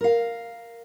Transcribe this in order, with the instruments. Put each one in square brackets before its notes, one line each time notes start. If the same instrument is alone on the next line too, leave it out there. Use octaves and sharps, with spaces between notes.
[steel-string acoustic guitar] A#4 F5